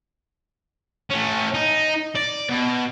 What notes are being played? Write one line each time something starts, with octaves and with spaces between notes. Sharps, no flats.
A3 C#4
D#4
D5
B2